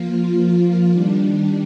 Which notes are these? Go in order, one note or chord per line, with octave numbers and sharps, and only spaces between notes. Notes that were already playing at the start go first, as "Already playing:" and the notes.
Already playing: F3 A#3 F4
D#3 G3 D4